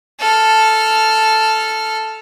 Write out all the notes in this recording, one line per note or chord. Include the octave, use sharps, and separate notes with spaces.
A4 F6